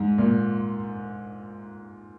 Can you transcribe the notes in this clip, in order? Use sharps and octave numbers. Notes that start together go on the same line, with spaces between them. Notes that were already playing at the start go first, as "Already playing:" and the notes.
Already playing: G#2
A#2